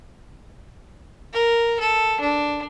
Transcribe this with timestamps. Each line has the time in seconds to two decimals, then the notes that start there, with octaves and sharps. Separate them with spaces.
1.33 A#4
1.80 A4
2.21 D4